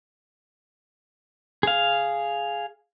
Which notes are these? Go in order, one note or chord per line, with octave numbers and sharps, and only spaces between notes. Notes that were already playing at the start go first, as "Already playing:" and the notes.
G#4 F5